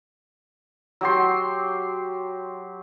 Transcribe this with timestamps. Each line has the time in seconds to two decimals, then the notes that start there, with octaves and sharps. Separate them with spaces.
1.01 F#3 G4 C6